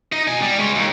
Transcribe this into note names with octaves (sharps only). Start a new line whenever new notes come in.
D#4 D#5
B2 G#5
G3
G#3 C#5
D#2